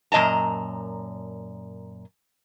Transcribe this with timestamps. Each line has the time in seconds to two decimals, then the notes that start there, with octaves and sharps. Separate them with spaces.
0.12 F#2 A#2 D#5 A5 A#5